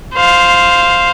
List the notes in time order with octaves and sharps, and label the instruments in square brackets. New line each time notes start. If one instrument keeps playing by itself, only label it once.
[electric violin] C5 F5